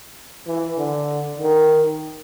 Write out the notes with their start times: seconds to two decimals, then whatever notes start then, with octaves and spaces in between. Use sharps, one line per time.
0.47 E3
0.77 D3
1.38 D#3